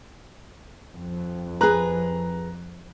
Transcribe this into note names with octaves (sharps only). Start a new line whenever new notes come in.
F2
G#4 B4 A#5 F#6